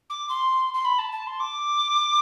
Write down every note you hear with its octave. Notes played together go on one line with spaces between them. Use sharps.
D6
C6
C6
B5
A5
A5
C6
D6